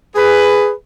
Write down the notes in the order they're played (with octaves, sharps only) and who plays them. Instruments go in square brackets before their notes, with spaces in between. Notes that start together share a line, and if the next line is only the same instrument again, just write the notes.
[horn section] G#4 B4